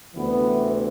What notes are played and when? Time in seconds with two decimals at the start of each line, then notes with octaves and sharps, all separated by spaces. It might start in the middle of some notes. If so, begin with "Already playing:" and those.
0.16 D2 C3 E3 B3